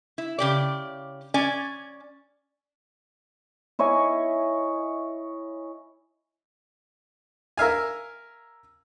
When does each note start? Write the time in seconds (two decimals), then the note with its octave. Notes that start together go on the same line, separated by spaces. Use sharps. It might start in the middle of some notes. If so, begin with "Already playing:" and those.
0.18 E4
0.38 C#3 G4 D5
1.34 C#4 D5 G#5
3.79 E4 C#5 D#5 G#5
7.57 A#4 E5 F5 G#5